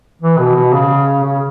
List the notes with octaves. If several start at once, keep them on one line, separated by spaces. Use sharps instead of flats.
E3
B2
B2
C#3
C#3